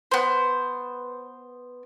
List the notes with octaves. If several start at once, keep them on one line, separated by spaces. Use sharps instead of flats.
B3 C5